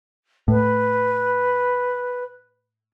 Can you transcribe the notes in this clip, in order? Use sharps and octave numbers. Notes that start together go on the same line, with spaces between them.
A2 B4